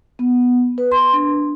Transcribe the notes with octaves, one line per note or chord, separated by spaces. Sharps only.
B3
B4
C6
D4